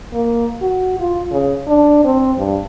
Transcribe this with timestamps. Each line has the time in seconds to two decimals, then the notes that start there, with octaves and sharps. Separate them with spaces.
0.13 A#3
0.62 F#4
1.00 F4
1.32 C#3
1.67 D4
2.04 C4
2.38 G2